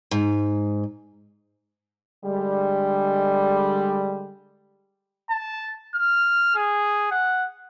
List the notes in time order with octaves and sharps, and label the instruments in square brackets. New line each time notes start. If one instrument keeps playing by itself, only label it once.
[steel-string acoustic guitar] G#2
[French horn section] D3 G3 G#3
[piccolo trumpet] A5
F6
G#4
F#5